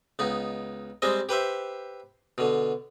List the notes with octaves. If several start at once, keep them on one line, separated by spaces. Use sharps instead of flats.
C#2 B3 D#4
G3 G#3 C4 C5 D#5
G4 B4 C5 E5
B2 D3